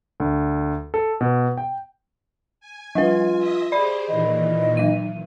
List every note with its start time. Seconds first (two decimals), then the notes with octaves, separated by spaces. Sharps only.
0.20 D2
0.94 A4
1.21 B2
1.57 G5
2.60 G#5
2.95 F3 G3 F4 B4
3.38 D#5 E5 D#6
3.72 G4 G#4 C5 D5 B5
4.07 A#2 D#3 E3 D#5
4.77 F#3 D#7